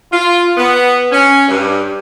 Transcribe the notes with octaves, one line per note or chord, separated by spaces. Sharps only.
F4
B3
C#4
G2